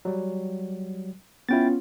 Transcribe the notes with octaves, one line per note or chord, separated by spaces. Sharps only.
F#3 G3
B3 C#4 E4 F4 G5 A6